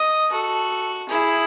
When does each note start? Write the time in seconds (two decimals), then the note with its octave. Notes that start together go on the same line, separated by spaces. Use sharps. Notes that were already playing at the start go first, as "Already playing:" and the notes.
Already playing: D#5
0.31 F#4 A4
1.09 E4 G#4